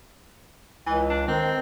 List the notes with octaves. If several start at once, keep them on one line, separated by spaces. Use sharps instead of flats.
C#2 E3
D4
D#3 C4